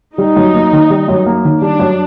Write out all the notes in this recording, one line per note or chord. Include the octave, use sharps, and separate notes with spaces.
G3 D#4
F#2
A#3
D#3
G3
F#2
A#3
D#3
G3 D4
F#2